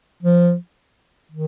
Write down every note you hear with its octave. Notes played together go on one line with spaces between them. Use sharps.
F3
D#3